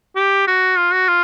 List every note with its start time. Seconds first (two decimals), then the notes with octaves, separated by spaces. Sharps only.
0.16 G4
0.47 F#4
0.78 F4
0.93 F#4
1.08 F4